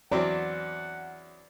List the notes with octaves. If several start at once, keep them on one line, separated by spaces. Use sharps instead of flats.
E2 F#3 C4 D5 F#5